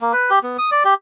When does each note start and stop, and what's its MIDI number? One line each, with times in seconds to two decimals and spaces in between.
0.01 0.12 58
0.13 0.30 71
0.30 0.39 67
0.43 0.57 59
0.58 0.70 87
0.72 0.83 74
0.85 0.94 67